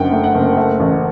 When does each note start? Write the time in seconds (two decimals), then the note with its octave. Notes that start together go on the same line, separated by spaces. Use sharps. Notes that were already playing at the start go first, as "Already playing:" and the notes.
Already playing: F#1 F#2 D3 F#5 G5
0.12 A3
0.24 F#5
0.35 F#1
0.57 A3
0.80 A1